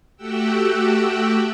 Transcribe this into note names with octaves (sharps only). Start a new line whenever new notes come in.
A3 F#4 G4 F#5 G5 E6